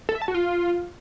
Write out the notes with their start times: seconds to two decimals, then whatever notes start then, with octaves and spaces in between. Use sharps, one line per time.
0.09 A4
0.15 E5
0.22 A5
0.28 F#4
0.34 F4